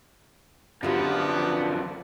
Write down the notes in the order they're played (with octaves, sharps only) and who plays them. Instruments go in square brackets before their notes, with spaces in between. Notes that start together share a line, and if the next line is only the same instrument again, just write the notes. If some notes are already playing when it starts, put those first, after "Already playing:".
[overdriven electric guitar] F#2 F3 [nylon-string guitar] D3 F4 G4 [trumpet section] B3 [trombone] D4